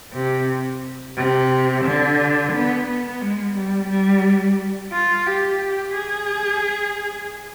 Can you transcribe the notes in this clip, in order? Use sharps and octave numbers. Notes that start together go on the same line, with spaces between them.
C3
C3
D3
B3
B3
G#3
G3
G3
F4
G4
G#4